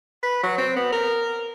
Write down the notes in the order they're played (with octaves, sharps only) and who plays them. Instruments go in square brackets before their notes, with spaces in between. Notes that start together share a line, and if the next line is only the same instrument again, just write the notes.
[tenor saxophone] B4
F#3
C4
B3
A#4